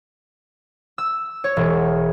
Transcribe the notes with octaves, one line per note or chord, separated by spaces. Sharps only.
E6
C#5
E1